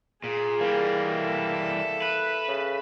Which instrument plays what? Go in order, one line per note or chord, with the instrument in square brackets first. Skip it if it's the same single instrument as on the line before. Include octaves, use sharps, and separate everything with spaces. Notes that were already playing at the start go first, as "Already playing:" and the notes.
[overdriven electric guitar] A#2 [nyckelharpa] G#4
[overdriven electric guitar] E3 G3 [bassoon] A#3
[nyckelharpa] A4 E5
[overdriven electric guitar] B4
[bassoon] C#3